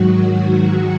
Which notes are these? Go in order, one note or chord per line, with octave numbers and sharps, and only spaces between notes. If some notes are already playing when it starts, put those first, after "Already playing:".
Already playing: G#2 D#3 F#3 F#4